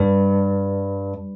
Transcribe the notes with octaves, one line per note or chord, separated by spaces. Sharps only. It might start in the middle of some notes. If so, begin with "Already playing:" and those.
Already playing: G2